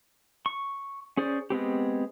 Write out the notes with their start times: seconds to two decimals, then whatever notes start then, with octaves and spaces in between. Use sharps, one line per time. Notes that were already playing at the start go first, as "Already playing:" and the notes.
0.46 C#6
1.17 C#4 G#4 C5 D5
1.50 G#3 B3 C4 G4